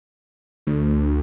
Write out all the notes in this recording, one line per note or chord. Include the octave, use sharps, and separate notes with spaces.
D2